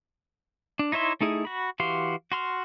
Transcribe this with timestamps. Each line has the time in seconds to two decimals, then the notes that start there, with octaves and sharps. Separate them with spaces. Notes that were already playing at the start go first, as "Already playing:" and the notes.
0.79 D4
0.92 D#4 E4 C#5 E5 C6
1.21 A3 D#4 E4 G#4
1.45 F#4 B5
1.80 E3 F#4 G4 F5 C6
2.32 F#4 C6 F6